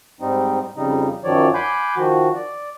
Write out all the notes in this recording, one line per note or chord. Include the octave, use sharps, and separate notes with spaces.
G#2 G3 C4 D#4
F2 C#3 G3 D#4
F#2 D#3 F3 F#3 C#5 D5
F#5 G#5 B5 C6 D6 G6
D#3 F3 F#4
D5